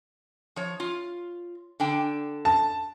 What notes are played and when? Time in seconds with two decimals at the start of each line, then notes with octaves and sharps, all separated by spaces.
0.56 F3 C#5
0.80 F4
1.80 D3 D4 G5
2.45 A5